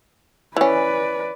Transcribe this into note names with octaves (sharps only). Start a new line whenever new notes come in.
E3 C#4 B4 D5